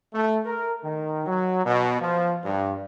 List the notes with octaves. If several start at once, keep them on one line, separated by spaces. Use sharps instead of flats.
A3
A#4
D#3
F#3
B2
F3
G2